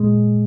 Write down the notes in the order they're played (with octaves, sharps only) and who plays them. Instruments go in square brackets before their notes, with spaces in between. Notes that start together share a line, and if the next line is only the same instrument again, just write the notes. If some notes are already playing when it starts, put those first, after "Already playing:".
Already playing: [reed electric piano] A#2 G#3